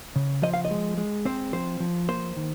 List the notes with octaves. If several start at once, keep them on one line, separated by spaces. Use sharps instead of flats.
C#3
F3 D#5
F5
D#5
G#3
G#3
C4 C5
F3 C5
F3
A#3 C5
D#3